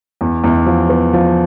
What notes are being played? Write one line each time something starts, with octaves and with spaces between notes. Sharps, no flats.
E2
E2
F3
B3
F3